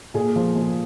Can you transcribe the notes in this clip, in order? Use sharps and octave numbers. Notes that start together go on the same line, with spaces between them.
A#2 G#4
F3
F3